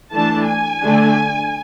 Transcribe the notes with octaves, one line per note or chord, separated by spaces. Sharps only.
E3 A3 D4 A5
G#5
D3 A3 D4